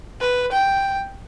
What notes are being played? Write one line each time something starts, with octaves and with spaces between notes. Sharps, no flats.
B4
G5